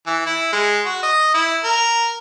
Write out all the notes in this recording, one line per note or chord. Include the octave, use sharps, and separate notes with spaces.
E3
E4
G#3
F#4
D#5
E4
A#4